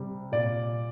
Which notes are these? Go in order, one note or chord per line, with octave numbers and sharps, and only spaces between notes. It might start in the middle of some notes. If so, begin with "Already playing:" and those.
Already playing: C3 G3
A#2 D5